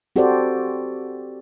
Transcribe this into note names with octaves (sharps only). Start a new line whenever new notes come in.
C4 F#4 G4 A4 C5 D5